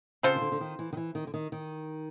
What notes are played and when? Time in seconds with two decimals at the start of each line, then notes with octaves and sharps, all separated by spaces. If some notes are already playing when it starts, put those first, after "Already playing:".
0.23 C#3 C4 F4 A4 C5
0.36 D#3
0.42 D3
0.52 D3
0.60 D#3
0.79 E3
0.93 D#3
0.97 E3
1.15 D#3
1.27 D3
1.34 D#3
1.52 D#3